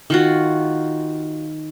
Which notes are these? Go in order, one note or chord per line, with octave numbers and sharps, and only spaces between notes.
D#3 F4 F#4